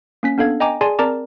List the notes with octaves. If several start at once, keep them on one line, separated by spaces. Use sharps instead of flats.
A#3 C#4 B6
B3 D4 A4 F5 G#6
D#5 G5 G#5 A#5 D6
G#4 D5 G#5 A5 C6
C4 A#4 D5 A5 A#5 D6